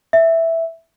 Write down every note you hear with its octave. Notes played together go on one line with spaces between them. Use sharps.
E5